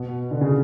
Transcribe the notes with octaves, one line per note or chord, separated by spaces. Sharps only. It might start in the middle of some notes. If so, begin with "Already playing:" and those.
Already playing: B2
D3
C#3